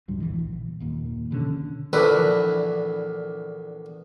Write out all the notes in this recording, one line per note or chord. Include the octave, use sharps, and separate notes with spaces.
D1 C#2 G2 F#3
A1 E2 E3
A#1
F#1 D#2 A#2
B2 D3 E3 C#4
A#1 E2 D3 E4 B4